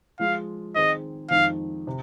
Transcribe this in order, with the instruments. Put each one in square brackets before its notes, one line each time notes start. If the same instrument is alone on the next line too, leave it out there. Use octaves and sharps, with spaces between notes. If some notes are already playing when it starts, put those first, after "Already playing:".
[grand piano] F3 G#3 F4 [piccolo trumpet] F5
[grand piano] D#3 C4 G#4 C5 [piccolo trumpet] D#5
[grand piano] F2 D#3 G#3 D#4 [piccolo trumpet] F5
[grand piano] C3